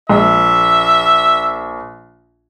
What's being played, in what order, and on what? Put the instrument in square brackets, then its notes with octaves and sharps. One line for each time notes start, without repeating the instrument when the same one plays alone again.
[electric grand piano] A#1 [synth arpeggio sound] G#3 [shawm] E5